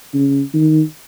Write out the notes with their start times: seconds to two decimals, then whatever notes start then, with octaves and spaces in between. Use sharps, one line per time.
0.14 C#3
0.54 D#3